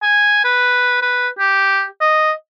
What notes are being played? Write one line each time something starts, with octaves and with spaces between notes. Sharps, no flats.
G#5
B4
B4
G4
D#5